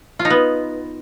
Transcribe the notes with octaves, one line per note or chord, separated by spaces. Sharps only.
F4
D#4
B3